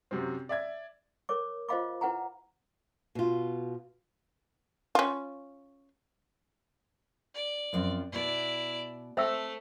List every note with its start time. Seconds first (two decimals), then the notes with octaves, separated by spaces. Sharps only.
0.11 F#2 C3 F#3 C4
0.49 D5 E5 G#6
1.29 A#4 C#5 D6
1.69 F4 C5 D#5 F5 B5 D6
2.01 E4 B4 F#5 G#5 A#5
3.15 B2 F4
4.95 C#4 F4
7.35 D5
7.73 F#2 F3 C4
8.12 B2 B3 E4 D5
9.17 A3 C4 C5 E5 E6